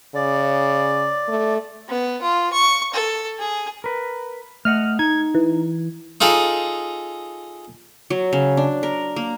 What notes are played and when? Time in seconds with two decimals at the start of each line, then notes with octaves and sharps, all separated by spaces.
0.15 C#3 D5
1.29 A3
1.88 B3
2.22 F4
2.53 C#6
2.94 A4
3.39 G#4
3.84 A#4 B4
4.65 A3 D#5 F#5 F6
4.99 D#4 G#6
5.35 E3
6.21 D#4 F4 G#4 A4
8.10 F#3
8.33 C#3
8.57 D4
8.83 A#4
9.16 A#3